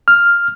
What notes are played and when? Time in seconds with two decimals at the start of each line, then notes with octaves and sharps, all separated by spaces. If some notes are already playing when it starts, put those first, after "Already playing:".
0.08 F6